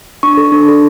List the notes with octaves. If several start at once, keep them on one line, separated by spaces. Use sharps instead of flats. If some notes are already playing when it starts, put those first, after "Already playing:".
D4 C#6
A4
D4
A4